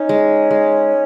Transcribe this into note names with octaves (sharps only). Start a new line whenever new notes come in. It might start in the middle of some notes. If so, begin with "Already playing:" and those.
Already playing: C#4 D#4
G#3
G#3